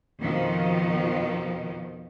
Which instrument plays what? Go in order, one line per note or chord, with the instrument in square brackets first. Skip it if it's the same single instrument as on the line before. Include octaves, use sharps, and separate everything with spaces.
[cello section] F2 B2 D#3 F3